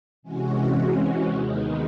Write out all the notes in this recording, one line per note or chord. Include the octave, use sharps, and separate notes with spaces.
C3 E3 G#3 C#4 F#4
D#2 D#3 G#3 B3 D#4